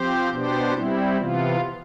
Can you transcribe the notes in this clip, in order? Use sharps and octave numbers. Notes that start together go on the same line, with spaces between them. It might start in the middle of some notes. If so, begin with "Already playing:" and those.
Already playing: F3 C4 G4 C5
B2 B3 D4 G4 C5
G3 C4 E4
C3 E3 B3 F4